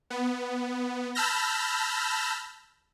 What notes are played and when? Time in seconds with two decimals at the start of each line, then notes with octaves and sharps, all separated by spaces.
0.10 B3
1.15 A5 B5 E6 F6 G6 A#6